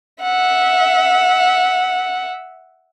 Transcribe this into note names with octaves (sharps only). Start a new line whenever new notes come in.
E5 F#5